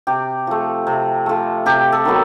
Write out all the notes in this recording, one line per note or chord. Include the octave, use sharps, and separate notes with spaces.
C3 G4
F3 A3
C3
F3 A3
C3 G4
A4
D#3 F#3 B3